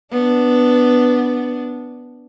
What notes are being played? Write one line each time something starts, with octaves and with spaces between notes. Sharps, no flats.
B3 D4